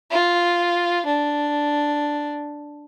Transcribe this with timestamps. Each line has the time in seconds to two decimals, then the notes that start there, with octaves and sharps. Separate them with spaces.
0.11 F4
1.06 D4